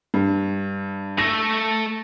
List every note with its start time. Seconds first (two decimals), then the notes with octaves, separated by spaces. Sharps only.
0.14 G2
1.18 A3 E5 A#6